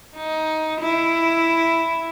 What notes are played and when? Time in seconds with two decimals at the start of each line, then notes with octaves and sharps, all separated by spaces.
0.16 D#4
0.81 E4